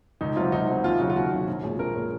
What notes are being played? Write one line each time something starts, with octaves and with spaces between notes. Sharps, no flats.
C#2 D#4
C3 F#3 F4
C#2 D#4
C3 F#3
D#2 F4
C#3 F#3 C#4 F#4
F4
D#2 F#4
C#3 F#3 C#4
A#1
A#2 G#3 C#4
A#1 A#4
A#2 G#3 C#4